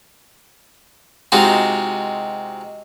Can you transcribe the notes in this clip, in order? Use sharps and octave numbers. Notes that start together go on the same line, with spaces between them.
C3 G#3 D#4 F4 F#4